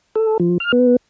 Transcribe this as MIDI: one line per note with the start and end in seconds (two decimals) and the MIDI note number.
0.16 0.37 69
0.40 0.58 53
0.60 0.72 89
0.72 0.96 59